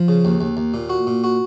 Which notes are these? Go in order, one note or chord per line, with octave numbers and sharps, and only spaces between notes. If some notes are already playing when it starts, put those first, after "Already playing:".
Already playing: F3
C#3
D#2
D#2
D#2
A#2
F#4
A#2
F#4